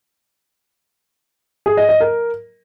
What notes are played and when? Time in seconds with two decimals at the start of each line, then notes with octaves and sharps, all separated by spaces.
1.66 G#4
1.77 D#5
1.89 D#5
2.00 A#4